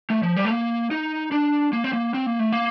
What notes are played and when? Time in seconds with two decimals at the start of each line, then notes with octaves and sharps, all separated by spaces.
0.10 A3
0.23 F3
0.37 G3
0.45 A3
0.50 A#3
0.91 D#4
1.32 D4
1.73 A#3
1.84 C4
1.93 A#3
2.14 C4
2.26 A#3
2.39 A3
2.52 A#3